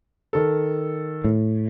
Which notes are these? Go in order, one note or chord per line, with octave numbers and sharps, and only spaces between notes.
D#3 A4
A2